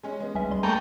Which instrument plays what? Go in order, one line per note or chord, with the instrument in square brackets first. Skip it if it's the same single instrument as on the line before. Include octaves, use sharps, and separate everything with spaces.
[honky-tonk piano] G#3 C#4
G#3 B3
[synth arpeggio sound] C2 C#4 E5
C2 G3 C6
[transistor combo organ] A3 A#3 G5 [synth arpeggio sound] G#5 B5 [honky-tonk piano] A#5 C#6